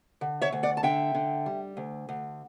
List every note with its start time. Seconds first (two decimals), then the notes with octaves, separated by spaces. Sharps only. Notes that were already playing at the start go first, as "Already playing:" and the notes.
0.21 D3
0.42 C#5 E5
0.52 D2
0.63 D5 F#5
0.77 A5
0.83 D3 E5 G5
1.15 D3
1.46 G3
1.77 D2
2.09 D2